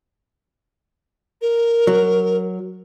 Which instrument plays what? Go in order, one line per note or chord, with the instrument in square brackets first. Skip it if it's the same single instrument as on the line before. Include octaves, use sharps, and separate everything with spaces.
[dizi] A#4
[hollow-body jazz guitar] F#3